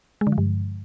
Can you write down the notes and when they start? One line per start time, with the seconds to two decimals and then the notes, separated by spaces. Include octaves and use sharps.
0.21 G#3
0.27 D3
0.32 F3
0.38 G2